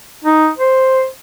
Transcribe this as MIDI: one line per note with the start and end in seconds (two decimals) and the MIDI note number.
0.24 0.50 63
0.58 1.06 72